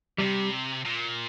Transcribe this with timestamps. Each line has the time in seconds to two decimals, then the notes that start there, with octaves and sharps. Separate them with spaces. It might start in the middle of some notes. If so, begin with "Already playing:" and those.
0.18 C3 G3
0.86 A#2